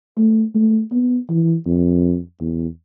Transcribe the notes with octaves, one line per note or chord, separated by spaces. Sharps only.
A3
A3
B3
E3
F2
E2